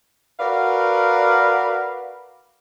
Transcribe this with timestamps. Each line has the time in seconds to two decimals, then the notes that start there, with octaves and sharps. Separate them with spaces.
0.40 F#4 A#4 B4 D5 F5